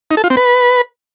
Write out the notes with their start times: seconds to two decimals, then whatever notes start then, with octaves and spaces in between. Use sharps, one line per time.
0.11 D#4
0.17 A4
0.24 F4
0.30 C4
0.37 B4